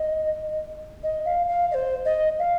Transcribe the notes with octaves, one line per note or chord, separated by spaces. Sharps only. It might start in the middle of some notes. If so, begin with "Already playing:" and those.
Already playing: D#5
D#5
F5
F5
D#5
C5
D#5
F5